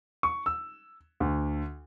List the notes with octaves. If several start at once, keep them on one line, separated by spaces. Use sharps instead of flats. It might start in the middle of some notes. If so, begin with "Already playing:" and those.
C#6
E6
D2